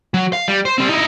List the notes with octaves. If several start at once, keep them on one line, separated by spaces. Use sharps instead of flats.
F#3
F5
G3
C5
G3 C4
D#4 E4